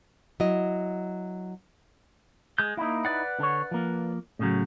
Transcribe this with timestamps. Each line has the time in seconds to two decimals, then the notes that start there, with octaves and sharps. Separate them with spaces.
0.40 F#3 E4 D#5
2.58 G#3 G6
2.77 A#3 D#4 E4
3.05 B4 D5 F#5
3.39 D3 C#5
3.71 F3 A#3
4.39 A2 C#3 F#3